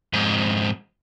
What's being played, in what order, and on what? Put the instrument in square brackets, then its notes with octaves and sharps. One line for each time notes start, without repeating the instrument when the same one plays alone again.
[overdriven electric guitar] F2 G#2